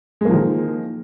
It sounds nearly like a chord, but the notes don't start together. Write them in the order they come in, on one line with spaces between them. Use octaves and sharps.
G#3 A#3 F3 D#3